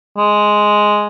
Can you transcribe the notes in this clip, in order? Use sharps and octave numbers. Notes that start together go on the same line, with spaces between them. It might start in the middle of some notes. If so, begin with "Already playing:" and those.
G#3